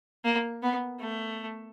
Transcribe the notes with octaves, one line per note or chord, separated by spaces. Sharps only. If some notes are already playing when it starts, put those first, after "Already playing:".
A#3
B3
A3